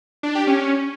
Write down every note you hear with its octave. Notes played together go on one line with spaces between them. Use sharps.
D4
G4
C#4